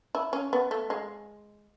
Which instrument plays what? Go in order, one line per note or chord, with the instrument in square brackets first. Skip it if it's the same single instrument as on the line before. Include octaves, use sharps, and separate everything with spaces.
[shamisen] E4
C#4
B3
A3
G#3